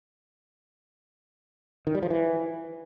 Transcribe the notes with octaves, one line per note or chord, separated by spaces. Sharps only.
D#3
G3
F3
E3